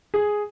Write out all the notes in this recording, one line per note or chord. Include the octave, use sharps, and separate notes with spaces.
G#4